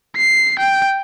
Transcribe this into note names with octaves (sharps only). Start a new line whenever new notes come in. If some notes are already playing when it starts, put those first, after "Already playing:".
C7
G5